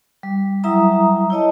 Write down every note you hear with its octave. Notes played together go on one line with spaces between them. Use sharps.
G3
F#3 G3 E4 E5 A#5 D#6
E4 C#5 D#5 A5